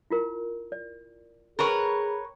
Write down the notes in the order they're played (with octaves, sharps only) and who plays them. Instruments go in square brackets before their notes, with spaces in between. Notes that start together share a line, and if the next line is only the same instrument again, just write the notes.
[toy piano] E4 F4 A#4
D5
[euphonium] G#4 [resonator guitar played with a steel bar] A#4 B4 C#5 [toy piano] G5 C#6